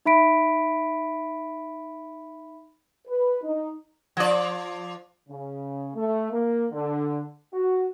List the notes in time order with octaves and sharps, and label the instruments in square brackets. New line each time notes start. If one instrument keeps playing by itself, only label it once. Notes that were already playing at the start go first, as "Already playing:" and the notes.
[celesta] D#4 E5 B5 B6 D7
[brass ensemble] B4
D#4
[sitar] F3 D5
[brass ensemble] C#3
A3
A#3
D3
F#4